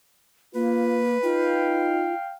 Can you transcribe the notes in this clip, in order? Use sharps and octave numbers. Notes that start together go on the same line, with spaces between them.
A#3 F4 B4
D#4 F4 F5 G5